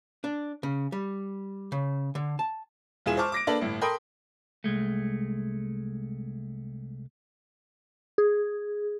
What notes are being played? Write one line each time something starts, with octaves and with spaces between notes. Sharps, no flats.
D4
C#3
G3
C#3
D3
A5
E1 E3 F4 G#4 G#5 E7
C5 A5 C#6 D6 F6
D6 A#6 D7
A#3 D4 A4 B4 D5
G1 A2
A4 A#4 G5 B5 C6 D#6
C2 G#3 A3
G#4